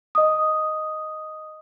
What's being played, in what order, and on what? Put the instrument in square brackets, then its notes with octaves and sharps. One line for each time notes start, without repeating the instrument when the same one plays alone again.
[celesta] D#5 D#6